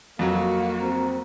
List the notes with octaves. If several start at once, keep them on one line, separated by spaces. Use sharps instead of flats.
F2 F#3 A#3 F#4 F5
C4 A#5